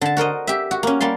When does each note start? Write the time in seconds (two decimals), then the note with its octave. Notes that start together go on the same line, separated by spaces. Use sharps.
0.01 D3 A5
0.17 F#4 A#4 C5 D#5
0.47 G4 E5
0.71 F#4
0.83 A#3 C#4
1.01 G3 A#3 A5 C6